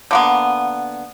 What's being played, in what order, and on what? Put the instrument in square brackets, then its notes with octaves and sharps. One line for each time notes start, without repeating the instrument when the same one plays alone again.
[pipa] D3 A#3 B3